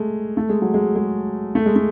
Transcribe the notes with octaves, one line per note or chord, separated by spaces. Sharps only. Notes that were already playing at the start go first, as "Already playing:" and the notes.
Already playing: G#3 A3
A3
G#3
F#3
G#3
G#3
A3
G#3
A3